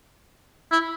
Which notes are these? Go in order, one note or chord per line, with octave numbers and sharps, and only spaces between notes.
E4